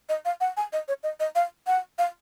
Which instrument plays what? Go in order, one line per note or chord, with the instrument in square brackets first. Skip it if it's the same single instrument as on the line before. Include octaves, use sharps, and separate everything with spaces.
[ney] D#5
F5
F#5
G#5
D#5
C#5
D#5
D#5
F5
F#5
F5